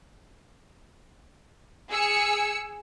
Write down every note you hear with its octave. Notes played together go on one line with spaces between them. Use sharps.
G#4 E6 C#7